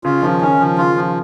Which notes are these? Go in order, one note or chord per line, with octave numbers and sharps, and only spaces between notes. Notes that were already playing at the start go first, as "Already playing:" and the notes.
C#3 F4
D#3 F3
D#3 C#4
C#3 F3
C#3 F4
F3